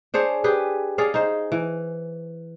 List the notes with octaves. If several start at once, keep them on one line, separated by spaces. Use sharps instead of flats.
D4 G#4 C5 C#5
G4 G#4 B4
C#4 G#4 D5 F5
D#4 C5
E3